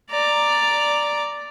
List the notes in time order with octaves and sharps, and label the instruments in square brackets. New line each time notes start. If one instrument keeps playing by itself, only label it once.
[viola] D5 A#5